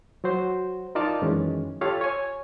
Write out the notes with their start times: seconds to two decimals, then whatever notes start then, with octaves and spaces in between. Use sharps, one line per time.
0.24 F#3 F#4 C5
0.95 D#4 F4 A#4 D5 F5 A5
1.22 F#2 D#3 E3 G#3 C#4
1.81 F4 G4 A4 C#5 F5
2.01 C#5 G#5